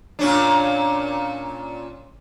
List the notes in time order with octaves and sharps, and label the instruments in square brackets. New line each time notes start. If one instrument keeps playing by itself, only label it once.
[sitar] A#2 C#4 D4